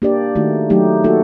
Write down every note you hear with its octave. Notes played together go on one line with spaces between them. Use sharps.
A#3 D4 G4 D5
D#3 A3 D#4 F#4
F#3 A3 D#4 G4
A#3 D#4 F#4 A4